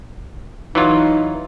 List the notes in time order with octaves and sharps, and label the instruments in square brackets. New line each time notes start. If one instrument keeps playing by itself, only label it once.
[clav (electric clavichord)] E3 F#3 F4 [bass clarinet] D#4